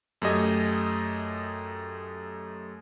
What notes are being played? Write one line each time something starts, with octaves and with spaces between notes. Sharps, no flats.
F#2 A3 G4 D#5 G#6